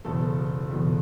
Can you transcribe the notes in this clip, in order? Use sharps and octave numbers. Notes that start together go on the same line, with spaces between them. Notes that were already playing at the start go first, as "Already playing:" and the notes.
F#1 E2 B2 A4
F#1 E2 B2